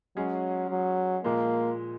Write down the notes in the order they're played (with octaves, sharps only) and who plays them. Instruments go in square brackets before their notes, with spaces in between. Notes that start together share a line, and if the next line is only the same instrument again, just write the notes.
[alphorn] F#3 [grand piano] G#3 C#4 G#4
[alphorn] F#3
[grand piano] A#2 F3 G#3 [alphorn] A#3